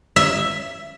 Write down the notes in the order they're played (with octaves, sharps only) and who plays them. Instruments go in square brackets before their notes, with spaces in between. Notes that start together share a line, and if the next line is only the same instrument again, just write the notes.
[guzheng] E5